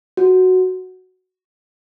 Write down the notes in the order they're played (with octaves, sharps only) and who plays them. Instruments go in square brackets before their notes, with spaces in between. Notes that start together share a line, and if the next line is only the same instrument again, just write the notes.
[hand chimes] F#4